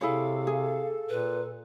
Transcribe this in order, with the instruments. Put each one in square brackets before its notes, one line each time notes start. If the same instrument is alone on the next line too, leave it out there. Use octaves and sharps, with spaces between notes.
[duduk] C3 [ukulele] E4 G#4 C#5 [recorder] A4 [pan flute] F5
[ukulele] G#4
[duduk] A#2 [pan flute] B4